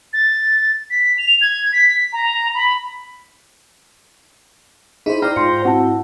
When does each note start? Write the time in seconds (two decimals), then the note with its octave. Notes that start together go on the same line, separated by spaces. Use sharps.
0.13 A6
0.90 B6
1.18 F7
1.41 G#6
1.73 B6
2.13 A#5
2.54 B5
5.06 D#4 E4 G#4 C5 B5
5.22 D#4 C5 D5 G5 A#5 F6
5.36 G#2 F4 C6 C#7
5.65 C4 E4 F#4 F#5 A5